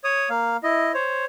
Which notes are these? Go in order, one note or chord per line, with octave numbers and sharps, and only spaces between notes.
C#5 D#6
A#3 F5
E4 D#5
C5 C#5